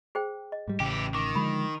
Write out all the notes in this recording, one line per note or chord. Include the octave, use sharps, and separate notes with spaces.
G#4 C5 G5
D#5
G#2 G3
A1 C#3 E3 G4 G5
D#3 D6
D3 F3 G#3 B5